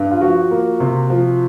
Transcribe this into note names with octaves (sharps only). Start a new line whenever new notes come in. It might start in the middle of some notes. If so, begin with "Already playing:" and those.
Already playing: G2
F4
F3 F#4
A#3
C3
F3